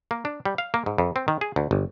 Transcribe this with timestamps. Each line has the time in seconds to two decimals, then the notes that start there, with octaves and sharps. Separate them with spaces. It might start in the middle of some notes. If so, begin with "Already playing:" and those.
0.11 A#3
0.25 D4
0.45 G3
0.58 F5
0.74 A#3
0.86 G#2
0.98 F2
1.16 C4
1.28 D#3
1.41 G#4
1.56 D2
1.71 G1